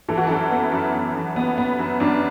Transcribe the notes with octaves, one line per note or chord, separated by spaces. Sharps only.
E3 A4
F#4
F#2 E4 A4
B3
F#2
F#2
F#2
B3
B3
F#2
F#2 D4